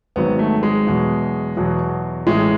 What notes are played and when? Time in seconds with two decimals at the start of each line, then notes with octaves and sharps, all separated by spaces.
0.16 G#1 G#2 F#3 B3
0.39 A3
0.63 G#3
0.87 E2 B2 F#3
1.57 E2 B2 F#3
2.27 A1 A2 E3 G#3